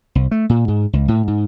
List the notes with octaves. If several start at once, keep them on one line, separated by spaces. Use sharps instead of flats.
C2
A3
A#2
G#2
C#2
A2
G#2